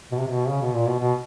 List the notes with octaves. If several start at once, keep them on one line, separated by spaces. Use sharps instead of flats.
B2
C3
B2
C#3
B2
A#2
B2
B2